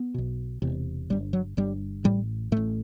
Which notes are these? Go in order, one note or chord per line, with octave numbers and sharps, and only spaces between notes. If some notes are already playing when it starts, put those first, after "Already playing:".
Already playing: B3
B1 B2
E1 E2 C3
G1 G2 G3
F#3
G1 G2 G3
A1 A2 G3
A1 A2 A3